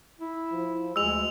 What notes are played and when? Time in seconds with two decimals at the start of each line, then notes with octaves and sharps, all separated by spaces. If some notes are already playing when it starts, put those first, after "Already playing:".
0.19 E4
0.51 F3
0.96 D2 G#3 E6 F7